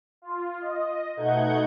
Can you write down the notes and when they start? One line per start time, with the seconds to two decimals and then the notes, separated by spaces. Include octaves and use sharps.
0.22 F4
0.61 D#5
1.17 B2 A3 D#4 F#5 G6 G#6